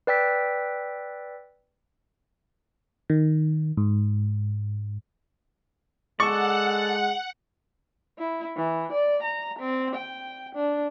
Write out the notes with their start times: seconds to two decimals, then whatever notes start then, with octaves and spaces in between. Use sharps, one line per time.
0.07 B4 D5 G5 E6 B6
3.10 D#3
3.77 G#2
6.20 G#3 A4 D5 F#5 C#6
8.18 E4
8.56 E3
8.92 D5
9.23 A#5
9.59 C4
9.95 G5
10.55 D4